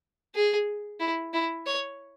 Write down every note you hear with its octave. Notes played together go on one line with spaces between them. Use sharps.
G#4
E4
E4
C#5